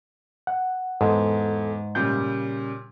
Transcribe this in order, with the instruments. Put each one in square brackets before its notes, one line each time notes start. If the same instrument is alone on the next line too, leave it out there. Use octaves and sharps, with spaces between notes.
[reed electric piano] F#5
[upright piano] E2 [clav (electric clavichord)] G#2 [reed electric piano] A4
[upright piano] A#2 C#3 G3 [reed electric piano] G6